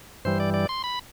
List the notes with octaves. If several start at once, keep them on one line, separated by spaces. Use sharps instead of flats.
G2 E3 G3 C5
D5
D5
C6
B5